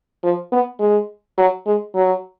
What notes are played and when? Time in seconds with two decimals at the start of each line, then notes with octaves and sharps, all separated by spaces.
0.23 F3
0.52 B3
0.80 G#3
1.38 F#3
1.66 G#3
1.95 F#3